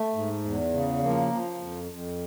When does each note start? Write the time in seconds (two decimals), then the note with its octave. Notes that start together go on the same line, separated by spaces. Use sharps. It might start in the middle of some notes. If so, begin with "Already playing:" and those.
Already playing: A3
0.14 G#2
0.44 E2
0.73 C#3
1.03 F3 A#3
1.32 F3
1.61 F2
1.91 F2